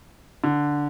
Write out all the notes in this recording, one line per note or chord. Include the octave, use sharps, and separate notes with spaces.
D3